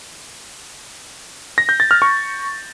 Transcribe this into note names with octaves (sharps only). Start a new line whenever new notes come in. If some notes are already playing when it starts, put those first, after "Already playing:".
A#6
G6
A6
F6
C#6